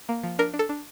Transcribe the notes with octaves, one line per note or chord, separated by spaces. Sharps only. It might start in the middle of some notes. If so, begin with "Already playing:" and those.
A#3
F3
D4 A#4
D4
A4
D4